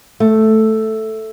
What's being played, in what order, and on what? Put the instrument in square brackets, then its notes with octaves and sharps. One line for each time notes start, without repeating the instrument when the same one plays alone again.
[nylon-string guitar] A3